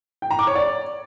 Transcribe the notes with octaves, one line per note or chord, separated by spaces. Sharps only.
G5
A#5
D6
C#5
D5